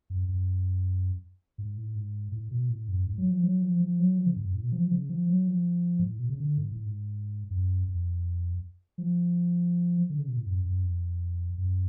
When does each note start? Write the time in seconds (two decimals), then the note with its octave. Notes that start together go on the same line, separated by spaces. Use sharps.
0.10 F#2
0.28 F#2
1.58 G#2
1.77 A2
1.95 G#2
2.32 A2
2.51 B2
2.69 A2
2.88 F#2
3.07 G#2
3.18 F#3
3.31 F3
3.43 F#3
3.62 F3
3.80 F3
3.99 F#3
4.18 F3
4.26 C#3
4.37 G#2
4.46 F#2
4.55 A2
4.63 B2
4.72 F3
4.83 F3
4.92 C#3
5.10 F3
5.29 F#3
5.48 F3
5.99 G#2
6.09 A2
6.19 B2
6.29 C#3
6.40 D3
6.58 G#2
6.71 A2
6.86 G#2
7.51 F#2
7.88 F2
8.98 F3
10.10 D3
10.19 C#3
10.28 B2
10.37 A2
10.46 F#2
10.65 F#2
10.84 F2
11.58 F#2